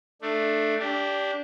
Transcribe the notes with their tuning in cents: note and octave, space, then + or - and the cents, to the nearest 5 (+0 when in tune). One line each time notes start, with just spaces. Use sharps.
A3 +5 D4 +20
D4 -20 G4 +0